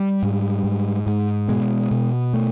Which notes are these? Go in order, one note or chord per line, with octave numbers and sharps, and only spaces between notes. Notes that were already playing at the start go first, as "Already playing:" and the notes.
Already playing: G3
G#2
G#2
G#2
B2 G#3
B2
A3